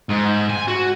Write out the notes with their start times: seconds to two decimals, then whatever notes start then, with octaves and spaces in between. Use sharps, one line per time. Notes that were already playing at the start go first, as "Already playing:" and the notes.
0.09 G#2
0.50 G#5
0.68 F#4